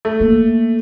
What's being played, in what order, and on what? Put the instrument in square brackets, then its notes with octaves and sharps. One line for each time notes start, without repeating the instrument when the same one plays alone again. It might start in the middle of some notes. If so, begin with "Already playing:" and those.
[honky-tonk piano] A3
[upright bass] A#3